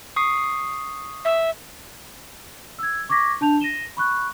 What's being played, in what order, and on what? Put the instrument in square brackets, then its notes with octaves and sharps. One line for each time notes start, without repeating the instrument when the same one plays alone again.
[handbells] C#6 D#6 C7
[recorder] E5
[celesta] E6 G#6
C#6 D6 G#6 A#6 B6
D4 A5 G6 F7
A#6 D#7 E7 G7
B5 C#6 F#6